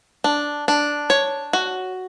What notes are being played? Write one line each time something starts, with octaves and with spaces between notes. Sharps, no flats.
D4
D4
C#5
F#4